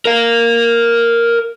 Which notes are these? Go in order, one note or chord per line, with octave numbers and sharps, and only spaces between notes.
A#4 F5